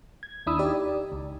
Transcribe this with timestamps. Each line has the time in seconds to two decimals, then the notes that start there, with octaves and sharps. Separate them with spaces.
0.23 G#6
0.46 D#2 D4 E4 B5 D#6 E6
0.59 D#4 G4 D5
1.12 C#2